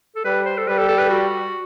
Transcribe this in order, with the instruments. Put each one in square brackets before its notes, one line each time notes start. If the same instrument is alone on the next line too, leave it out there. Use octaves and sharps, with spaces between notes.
[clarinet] A4
[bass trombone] G3 [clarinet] B4
[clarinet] C5
A4
[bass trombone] G3 [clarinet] B4
[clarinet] A4
A4
B4
F#4